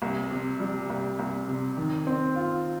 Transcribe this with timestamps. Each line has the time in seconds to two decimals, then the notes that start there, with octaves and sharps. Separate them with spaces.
0.02 C2
0.31 C3
0.60 G3
0.90 C2
1.19 C2
1.48 C3
1.77 D#3
2.07 C4
2.36 F4